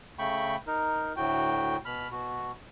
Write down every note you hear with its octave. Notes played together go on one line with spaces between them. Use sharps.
C#3 A3 G5 B5 C#6
D#4 A#4
D2 A2 F#4 G5
B2 B5 F6
B2 F#4